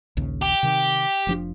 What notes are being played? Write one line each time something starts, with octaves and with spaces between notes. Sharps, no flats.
A#1 D#2 C#3
G4
C3 D#3
F1 F3 D4